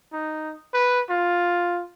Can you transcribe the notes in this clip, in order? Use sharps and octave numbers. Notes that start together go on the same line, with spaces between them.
D#4
B4
F4